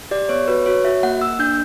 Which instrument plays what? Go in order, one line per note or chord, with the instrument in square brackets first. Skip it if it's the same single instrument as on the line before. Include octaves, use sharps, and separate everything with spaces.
[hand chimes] G4 D5
B3 C#5
F#4 B4
F#4 C#5
F#4 E5
A#3 F#5
A#3 E6
D4 G6